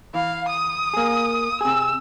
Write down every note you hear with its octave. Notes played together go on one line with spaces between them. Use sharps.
E3 F5
D#6
A#3 G#4
C3 G#4 E6